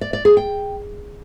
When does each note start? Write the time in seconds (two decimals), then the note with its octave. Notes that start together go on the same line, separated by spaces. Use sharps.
0.01 D5
0.13 D5
0.25 G#4
0.37 G5